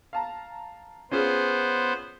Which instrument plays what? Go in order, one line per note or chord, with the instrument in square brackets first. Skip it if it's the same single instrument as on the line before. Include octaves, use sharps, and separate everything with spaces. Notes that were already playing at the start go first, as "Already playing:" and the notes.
[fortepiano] F5 A5 A#5
[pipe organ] B3 C5 [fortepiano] C#4 F4 G#4